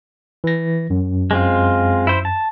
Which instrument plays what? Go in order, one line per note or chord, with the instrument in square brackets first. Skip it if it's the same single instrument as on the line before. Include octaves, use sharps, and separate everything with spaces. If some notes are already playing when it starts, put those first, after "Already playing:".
[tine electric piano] E3 A#6
F#2
[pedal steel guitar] G#3 C4 F4
E4 C5
A5